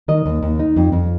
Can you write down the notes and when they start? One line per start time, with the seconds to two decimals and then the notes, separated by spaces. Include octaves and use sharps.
0.08 D#3 D#5
0.26 D#2
0.43 D#2
0.59 D#4
0.76 F2
0.92 F2